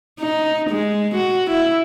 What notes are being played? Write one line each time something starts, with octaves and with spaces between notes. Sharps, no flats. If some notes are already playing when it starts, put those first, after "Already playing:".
D#4
G#3
F#4
E4